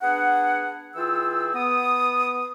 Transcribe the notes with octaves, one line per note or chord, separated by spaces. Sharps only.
B3 D4 G#4 F#5
E3 F4 G#4 G5 E6
B3 D#6